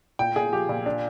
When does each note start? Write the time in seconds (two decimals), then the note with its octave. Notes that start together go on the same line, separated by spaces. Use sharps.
0.19 A#2 G5
0.36 A#2 G#4
0.52 F3 G4
0.69 A#2
0.86 D4